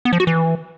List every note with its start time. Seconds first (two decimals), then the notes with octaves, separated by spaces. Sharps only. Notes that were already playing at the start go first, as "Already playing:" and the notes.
0.05 B3
0.13 F3
0.20 F#4
0.27 E3